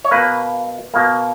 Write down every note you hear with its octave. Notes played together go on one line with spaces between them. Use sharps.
C#5
B2 A#3 B4
B2 A#3